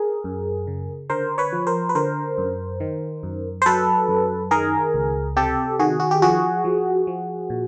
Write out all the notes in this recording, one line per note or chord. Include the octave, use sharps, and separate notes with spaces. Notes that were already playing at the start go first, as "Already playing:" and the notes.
Already playing: G#4 A#4
F#2
C#3
D3 A#4 C5
B4 C#5
F3
A#4 C5
B4
D3 A#4 C5
F#2
D#3
F#2
C5
F#3 A4 B4
F#2
D#3 G#4 A#4
C#2
C3 G4 A4
D#3 F#4 G#4
F#4
G4
F3 F#4 G#4
F3
F3
A#2